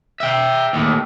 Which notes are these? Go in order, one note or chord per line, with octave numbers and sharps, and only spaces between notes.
E5 G5
D#2 A2